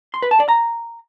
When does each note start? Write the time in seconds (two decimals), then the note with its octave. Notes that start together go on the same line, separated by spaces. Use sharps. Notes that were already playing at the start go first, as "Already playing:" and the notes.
0.14 C6
0.22 B4
0.31 A5
0.40 D5
0.49 A#5